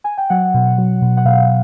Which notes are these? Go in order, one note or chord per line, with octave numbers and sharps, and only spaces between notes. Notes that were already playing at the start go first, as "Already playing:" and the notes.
G#5
G5
F#3 F#5
B2
F#3
B2
F#5
B2 F5